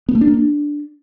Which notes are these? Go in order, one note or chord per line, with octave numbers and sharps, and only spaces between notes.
B3
A3
D4
A#3
D4